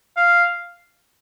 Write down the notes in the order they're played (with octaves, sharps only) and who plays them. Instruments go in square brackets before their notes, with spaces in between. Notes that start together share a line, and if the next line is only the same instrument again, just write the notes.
[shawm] F5